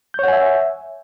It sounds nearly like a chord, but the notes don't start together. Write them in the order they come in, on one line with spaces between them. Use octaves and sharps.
G6 C#5 F#5 G#5 E5